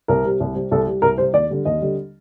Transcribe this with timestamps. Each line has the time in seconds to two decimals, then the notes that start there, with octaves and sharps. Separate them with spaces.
0.08 C2 A#4
0.24 C3 G3
0.40 C2
0.55 C3 G3
0.71 C2 A4
0.87 C3 G3
1.02 C2 A#4
1.18 C3 G3 C5
1.33 D#2 D5
1.50 D3 G3
1.65 D#2 D#5
1.81 D3 G3